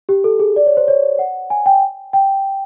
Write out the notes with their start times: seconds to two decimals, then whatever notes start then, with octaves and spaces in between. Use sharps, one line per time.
0.09 G4
0.24 A4
0.39 G#4
0.56 D5
0.66 C#5
0.77 C5
0.88 C#5
1.19 F#5
1.50 G#5
1.66 G5
2.13 G5